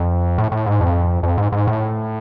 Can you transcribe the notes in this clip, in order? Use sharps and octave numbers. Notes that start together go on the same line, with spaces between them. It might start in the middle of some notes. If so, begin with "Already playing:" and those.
Already playing: F2
A2
A2
G#2
F2
F2
G#2
G#2
A2